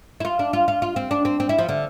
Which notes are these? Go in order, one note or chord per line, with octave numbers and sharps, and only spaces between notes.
E4
F4
D4
F4
F4
F4
C4
D4
C4
C4
E4
F3
D3